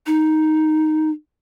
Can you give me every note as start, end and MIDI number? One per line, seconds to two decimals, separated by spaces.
0.07 1.10 63